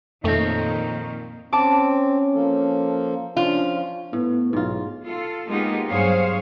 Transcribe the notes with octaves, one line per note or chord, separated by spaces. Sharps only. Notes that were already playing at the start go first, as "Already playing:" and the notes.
F2 A#2 D#3 F3 A3 C4 D#4 C#5
C4 C#4 A5 D6
F3 A#3 A4
F3 C#4 D4 F4
A2 B3
B1 G#2 F4
F4 A4
G#3 A#3 B3 D#4 F4 G4
G2 F#3 G#4 C5 C#5 F5